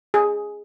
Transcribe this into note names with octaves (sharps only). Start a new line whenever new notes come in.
G#4